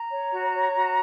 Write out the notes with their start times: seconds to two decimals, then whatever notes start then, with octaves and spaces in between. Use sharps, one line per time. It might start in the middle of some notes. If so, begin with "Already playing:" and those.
Already playing: A#5
0.12 C#5
0.32 F#4
0.53 C#5
0.74 F#4